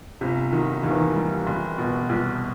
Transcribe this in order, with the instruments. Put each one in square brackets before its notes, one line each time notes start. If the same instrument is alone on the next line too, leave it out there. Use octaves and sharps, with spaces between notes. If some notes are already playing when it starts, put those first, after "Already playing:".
[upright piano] G1 [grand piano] C3
[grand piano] D#3 [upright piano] F#3
[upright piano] D#2 [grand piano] D#3
[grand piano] E3
D#3
[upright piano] G3
F#1
B2
C2